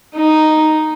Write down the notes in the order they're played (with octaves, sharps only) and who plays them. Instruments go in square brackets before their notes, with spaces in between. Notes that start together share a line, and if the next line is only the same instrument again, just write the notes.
[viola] D#4